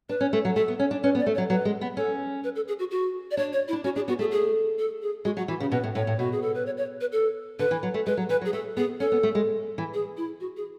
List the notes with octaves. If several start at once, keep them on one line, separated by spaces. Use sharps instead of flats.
D4 B4
C#4
A3
F#3
A3 A4
B3
C#4
D4
C#4 B4
B3
D5
A3
C#5
F#3
F#3 B4
G#3
B3
C#4 A4
B4
A4
G#4
F#4
F#4
D5
D4 C#5
C#5
E4
D4
C#4 F#4
D4 G#4
B3 F#4
A3 G#4
G#4
A4
G#4
G#3 F#4
F#3 F#4
E3 F#4
C#3 G#4
B2 B4
A2
A2 C#5
A2
B2 F#4
G#4
A4
B4
C#5
C#5
B4
A4
D3 B4
E3
F#3
A3
G#3 B4
F#3
E3 B4
F#3
G#4
A3 A4
B3 G#4
C#4 A4
B3
A3
G#3
E3
G#4
E4
F#4
G#4